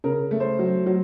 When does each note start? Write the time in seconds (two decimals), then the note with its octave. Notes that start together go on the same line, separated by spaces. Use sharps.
0.04 C#3 A#4
0.31 A3
0.40 C5
0.59 F#3
0.86 F#3